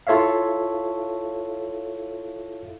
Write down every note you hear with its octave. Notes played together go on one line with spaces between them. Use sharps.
E4 F4 A4 C#5 E5 F5